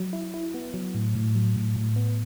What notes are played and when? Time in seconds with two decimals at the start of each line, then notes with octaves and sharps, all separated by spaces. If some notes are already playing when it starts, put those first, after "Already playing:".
Already playing: F#3
0.13 E4
0.34 E4
0.54 B3
0.74 F#3
0.94 A2
1.15 A2
1.35 F#3
1.56 A2
1.76 A2
1.96 B3